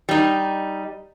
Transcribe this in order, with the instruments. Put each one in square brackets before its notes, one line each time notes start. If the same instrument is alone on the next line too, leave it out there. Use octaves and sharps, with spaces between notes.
[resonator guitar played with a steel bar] G3 D#4